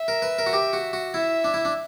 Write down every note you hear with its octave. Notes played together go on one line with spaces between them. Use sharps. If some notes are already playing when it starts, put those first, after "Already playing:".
Already playing: E5
A#4
B4
A#4
F#4
G4
F#4
F#4
E4 E5
D4
E4
D4